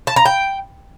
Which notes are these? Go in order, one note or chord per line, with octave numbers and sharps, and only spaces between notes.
A5
A#5
G5